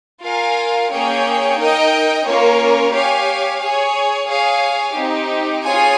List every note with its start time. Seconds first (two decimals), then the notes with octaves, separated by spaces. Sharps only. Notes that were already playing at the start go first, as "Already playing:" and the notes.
0.24 F4 A#4 F5 G#5
0.91 A#3 C#4 G#4 C#5 G5
1.58 D#4 A#4 D#5 G5
2.26 A#3 C#4 F4 A#4 C#5
2.93 G4 C#5 F5 G#5
3.61 G#4 C#5 G#5
4.28 G#4 C#5 F5 G#5
4.95 C4 D#4 G4
5.63 F4 G#4 C#5 G#5